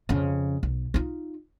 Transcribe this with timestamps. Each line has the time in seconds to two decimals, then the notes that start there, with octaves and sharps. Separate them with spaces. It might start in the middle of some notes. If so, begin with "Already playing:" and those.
0.09 F2 C#3
0.63 B1
0.94 D#4 F4